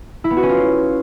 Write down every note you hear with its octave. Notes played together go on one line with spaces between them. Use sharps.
E4
B3
F#4
C#4
F4